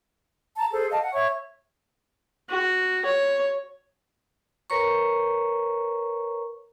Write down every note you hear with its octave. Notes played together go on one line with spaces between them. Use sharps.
A5 A#5
G#4 A4 C5
D#5 F5 A5
F#5
C#5 E5 C#6
F#4
C#5
A#4 B4 C#5 A#5 C#6